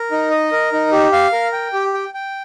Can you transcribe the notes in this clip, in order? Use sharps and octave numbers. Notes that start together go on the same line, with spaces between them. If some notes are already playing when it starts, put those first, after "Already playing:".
Already playing: A#4
D#4
D#5
A#4
D#4
G4
F5
A#4
G5
G4
G5
G5